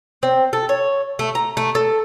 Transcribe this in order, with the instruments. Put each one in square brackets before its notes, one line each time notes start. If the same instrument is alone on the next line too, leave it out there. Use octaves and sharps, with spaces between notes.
[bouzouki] C4
A4
C#5
A3
A#5
A3
A4